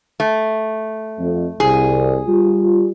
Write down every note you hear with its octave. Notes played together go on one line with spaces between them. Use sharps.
A3
F2
C2 G#4
G3 F4